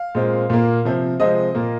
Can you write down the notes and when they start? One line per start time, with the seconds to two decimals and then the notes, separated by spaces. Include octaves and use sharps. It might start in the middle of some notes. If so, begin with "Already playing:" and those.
Already playing: F5
0.15 A#2 G#3 C4
0.50 A#2 A#3
0.85 C3 F3 C4
1.20 C3 F3 G#3 C4 D#5
1.55 A#2 A#3